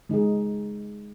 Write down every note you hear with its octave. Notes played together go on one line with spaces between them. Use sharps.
G#3 D#4 G#4